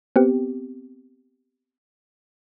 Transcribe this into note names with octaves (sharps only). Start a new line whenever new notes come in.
B3 C4 G4